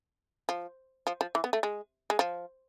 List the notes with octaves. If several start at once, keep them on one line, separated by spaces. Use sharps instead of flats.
F3
F3
F3
E3
B3
A3
G#3
G#3
F3